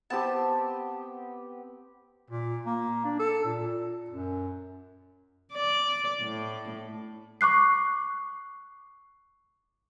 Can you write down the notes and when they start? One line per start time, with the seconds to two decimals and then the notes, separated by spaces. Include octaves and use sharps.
0.10 B3 C4 G4 A5
2.30 A#2
2.66 A#3
3.05 D4
3.19 A4
3.45 A#2
4.10 F#2
5.53 D5
6.22 A2
7.41 C#6 D6 F#6 C7